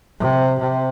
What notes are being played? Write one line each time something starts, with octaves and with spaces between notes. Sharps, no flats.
C3
C3